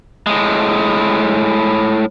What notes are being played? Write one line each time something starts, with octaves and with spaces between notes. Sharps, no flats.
A2 G#3